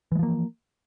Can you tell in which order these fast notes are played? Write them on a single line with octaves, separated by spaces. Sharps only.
E3 G#3 F3 A#3